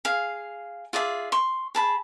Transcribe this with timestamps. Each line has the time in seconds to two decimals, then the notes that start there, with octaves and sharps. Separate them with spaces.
0.05 G#4 F5
0.93 F4 G#4 D5 E5
1.32 C6 C#6
1.75 G#4 A5 B5